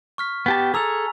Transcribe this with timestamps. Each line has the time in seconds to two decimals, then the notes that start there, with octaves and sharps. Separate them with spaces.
0.18 C#6 F6 B6
0.46 B3 G4 A5
0.74 G#4 A4 A#5 E6 F7